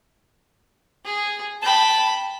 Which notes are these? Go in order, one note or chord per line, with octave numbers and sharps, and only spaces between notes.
G#4
G5 A5 B5